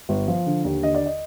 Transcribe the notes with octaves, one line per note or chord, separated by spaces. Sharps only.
G1
F3
D3
D#2
D3 D#5
D5
D#5